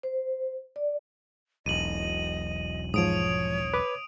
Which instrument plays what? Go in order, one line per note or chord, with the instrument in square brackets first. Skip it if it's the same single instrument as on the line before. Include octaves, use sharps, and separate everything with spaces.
[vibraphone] C5
D5
[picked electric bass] E1 B1 [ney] D#5 [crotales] D#7 F#7
[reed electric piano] G#2 F3 [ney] C#5 [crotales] D#6 D7 F7
[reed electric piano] B4 D6